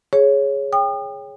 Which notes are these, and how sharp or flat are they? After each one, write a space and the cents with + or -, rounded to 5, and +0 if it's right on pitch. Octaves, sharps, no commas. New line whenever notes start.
G#4 +0 C#5 +0
G5 +20 D#6 -40